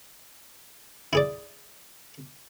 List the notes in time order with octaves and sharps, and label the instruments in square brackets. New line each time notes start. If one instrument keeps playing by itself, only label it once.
[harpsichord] E4 G#4 D5